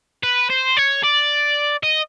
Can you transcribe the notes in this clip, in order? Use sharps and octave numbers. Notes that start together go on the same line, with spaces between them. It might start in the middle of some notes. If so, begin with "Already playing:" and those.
B4
C5
C#5
D5
D#5